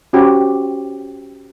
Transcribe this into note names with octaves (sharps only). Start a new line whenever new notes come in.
C#4 F#4 G4 C5